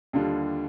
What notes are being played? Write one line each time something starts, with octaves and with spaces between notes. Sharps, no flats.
D#2 D3 G3 D4 F4